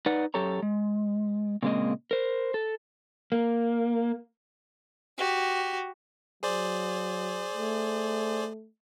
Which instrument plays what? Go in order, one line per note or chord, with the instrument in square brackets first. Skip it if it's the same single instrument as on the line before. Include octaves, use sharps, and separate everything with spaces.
[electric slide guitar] D#4 B4 D5 F#5
F#2 G4 A4 C#5 A#5
G#3
A#2 C#3 G#3 A#3 C4 D#5
A#4 C5
A4
A#3
[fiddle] F#4 G4
[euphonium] F#3 [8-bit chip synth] G#4 C5 D5
[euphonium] A3